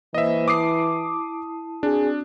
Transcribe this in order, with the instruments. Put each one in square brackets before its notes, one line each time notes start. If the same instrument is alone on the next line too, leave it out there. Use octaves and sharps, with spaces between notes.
[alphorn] E3 [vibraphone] A#3 C5 [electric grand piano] D#5 E5
[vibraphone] E4 A5 [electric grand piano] D6 D#6 C7
[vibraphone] C4 F#4 D5 [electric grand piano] D4 [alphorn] G#4